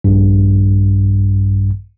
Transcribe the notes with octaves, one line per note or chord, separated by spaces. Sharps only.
A#1 G2